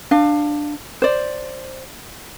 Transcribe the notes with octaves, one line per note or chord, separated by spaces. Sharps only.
D4 F5
C5 D5